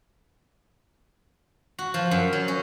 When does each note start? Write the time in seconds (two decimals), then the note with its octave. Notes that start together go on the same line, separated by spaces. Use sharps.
1.79 F#4
1.94 F3
2.11 F#2
2.33 F#3
2.48 C#4